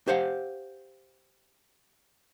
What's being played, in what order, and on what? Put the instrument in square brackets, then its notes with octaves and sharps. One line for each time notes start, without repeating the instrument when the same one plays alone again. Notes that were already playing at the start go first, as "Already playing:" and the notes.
[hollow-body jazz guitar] G4 C5 F5 F#5